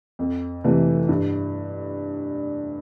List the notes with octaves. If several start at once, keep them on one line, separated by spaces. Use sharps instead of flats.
F2
C3 E3 A3
G2